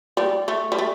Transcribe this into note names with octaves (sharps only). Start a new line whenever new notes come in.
G3
A3
G3
A3